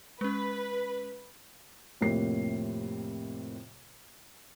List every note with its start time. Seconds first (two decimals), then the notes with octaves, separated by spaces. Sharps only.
0.21 G#3 C#4 B4
2.01 F2 A2 C3 A#3 C7